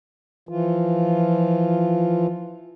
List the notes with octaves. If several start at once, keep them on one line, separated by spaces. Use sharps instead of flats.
E3 F3 F4